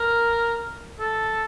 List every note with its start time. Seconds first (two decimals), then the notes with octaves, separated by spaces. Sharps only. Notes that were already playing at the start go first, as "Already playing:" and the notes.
Already playing: A#4
0.99 A4